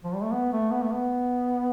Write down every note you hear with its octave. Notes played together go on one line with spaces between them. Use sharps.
F3
G3
A3
B3
A3
B3
A3
B3